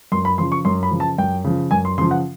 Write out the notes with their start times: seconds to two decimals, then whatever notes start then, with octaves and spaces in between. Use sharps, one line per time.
0.12 F#2 C6
0.25 B5
0.38 C#3 F3 C6
0.52 C#6
0.65 F#2 C6
0.83 B5
0.91 C#3 F3
1.00 A5
1.18 F#2 G5
1.44 C#3 F3
1.71 F#2 G#5
1.85 C6
1.98 C#3 C6
2.01 F3
2.11 F#5